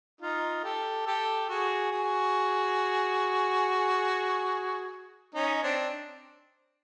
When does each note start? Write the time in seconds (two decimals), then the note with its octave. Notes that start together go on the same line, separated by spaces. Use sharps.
0.21 D#4 F4
0.64 G4 A4
1.06 G4 A4
1.49 F#4 G#4
1.92 F#4 G#4
5.34 C#4 D#4
5.63 C4 D4